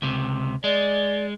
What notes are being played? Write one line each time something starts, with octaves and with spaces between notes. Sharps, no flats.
C#2 C3
G#3 D5